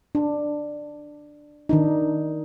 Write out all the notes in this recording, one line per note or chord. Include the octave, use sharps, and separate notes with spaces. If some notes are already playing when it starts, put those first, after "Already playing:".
D4
D#3 D4 D#4